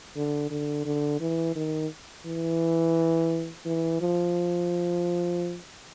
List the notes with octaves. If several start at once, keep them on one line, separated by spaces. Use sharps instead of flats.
D3
D3
D3
E3
D#3
E3
E3
F3